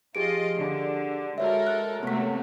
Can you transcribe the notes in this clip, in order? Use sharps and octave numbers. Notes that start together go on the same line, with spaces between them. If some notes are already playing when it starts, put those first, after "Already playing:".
F3 F4 G4 G#4 D#5 D7
D3
G#3 F#4 A4 A#4 C#5 E5
F#6
C3 F#3 A3 B3 B6